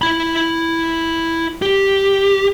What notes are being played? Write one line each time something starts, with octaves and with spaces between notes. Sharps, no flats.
E4 B5
G4